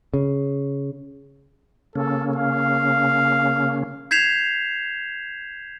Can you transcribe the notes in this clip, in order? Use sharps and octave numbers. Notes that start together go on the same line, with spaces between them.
C#3
C#3 A#3 C#4 A4
F5
G6 G#6 B6 C7 E7 F7